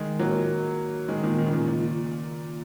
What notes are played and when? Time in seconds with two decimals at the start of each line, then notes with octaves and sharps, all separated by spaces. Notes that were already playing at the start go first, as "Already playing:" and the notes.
Already playing: D#3 G#3
0.19 F#3 A#3
1.08 D#3 G#3
1.23 A#2 D#3
1.38 D#3
1.46 C#3
1.53 A#2 D#3
1.68 A#2